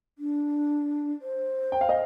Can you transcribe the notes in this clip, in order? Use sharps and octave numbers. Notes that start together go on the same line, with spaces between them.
D4
C5
G5
F5
D#5